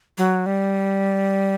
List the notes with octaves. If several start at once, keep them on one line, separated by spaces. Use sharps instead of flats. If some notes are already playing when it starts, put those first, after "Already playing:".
F#3
G3